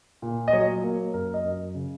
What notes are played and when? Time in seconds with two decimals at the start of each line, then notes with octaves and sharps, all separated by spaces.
0.22 A#2
0.48 D#5
0.53 F#3 C#5
0.84 A#3
1.14 F#2 A#4
1.34 D#5
1.44 F#2
1.75 C#3